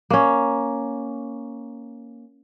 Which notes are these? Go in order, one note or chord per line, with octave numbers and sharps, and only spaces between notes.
A#3 C#4